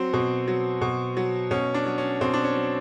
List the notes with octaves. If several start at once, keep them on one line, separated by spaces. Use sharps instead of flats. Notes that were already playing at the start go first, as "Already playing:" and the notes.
Already playing: F#3 C4
B2
F#3
B2
F#3
B2 C#4
D4
F#3
C#4
B2 C4
D4
C#4
F#3